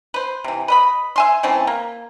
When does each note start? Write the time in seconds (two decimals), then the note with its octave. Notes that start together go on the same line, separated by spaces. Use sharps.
0.14 B4 C5
0.44 C3 E3
0.68 B4 D#5 B5
1.16 E5 G#5 C6
1.43 E3 A3 C4 C#4
1.67 A#3